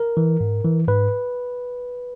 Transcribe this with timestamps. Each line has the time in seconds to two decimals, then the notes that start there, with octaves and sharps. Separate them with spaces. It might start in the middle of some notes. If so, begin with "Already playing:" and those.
Already playing: A#4
0.17 E3
0.40 G#2
0.65 E3
0.88 G#2 B4